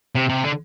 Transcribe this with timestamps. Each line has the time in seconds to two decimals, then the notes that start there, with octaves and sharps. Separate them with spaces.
0.15 C3
0.29 C3
0.44 D3